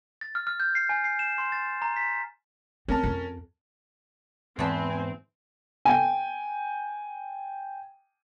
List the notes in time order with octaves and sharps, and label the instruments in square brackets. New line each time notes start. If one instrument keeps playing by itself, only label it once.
[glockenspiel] A6
F6
F6
G6
C7
G#5
C7
E7
C6
A6
A#5
B6
[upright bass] C4 [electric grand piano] C#4 A#4 A5
[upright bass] F2
[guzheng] E2 B4 A5 [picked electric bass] G#2 [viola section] C4 [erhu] G#5
[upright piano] G5 G#5